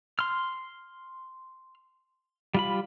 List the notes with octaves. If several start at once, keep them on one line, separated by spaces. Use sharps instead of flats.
C6 F6
G3 F4 B5